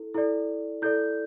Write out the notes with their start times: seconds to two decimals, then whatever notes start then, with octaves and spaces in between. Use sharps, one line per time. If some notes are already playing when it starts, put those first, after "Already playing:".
Already playing: E4 A4
0.14 E4 A4 D5
0.82 E4 A4 D5 G6